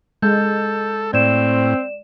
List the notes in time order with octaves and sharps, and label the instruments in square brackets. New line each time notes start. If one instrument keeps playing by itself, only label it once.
[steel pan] G#3 [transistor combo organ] A4 [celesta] G6
[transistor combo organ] A2 [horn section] C4 [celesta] D5 E7